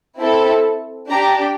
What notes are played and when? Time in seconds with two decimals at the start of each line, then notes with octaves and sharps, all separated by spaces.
0.18 C4 E4 A4
1.10 D4 G4 A#5